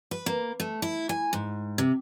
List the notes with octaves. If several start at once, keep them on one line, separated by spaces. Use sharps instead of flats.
B4
A#3
A3
E4
G#5
G#2
C3